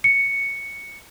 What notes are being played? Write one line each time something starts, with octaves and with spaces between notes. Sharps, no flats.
C#7